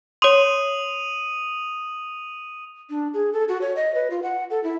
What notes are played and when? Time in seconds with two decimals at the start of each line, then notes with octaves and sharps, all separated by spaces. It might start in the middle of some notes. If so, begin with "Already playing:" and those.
0.22 C#5 C6 D#6 D#7 F7
2.90 D4
3.14 G#4
3.33 A4
3.48 F#4
3.61 C#5
3.76 D#5
3.95 B4
4.10 F4
4.23 F#5
4.50 A4
4.64 E4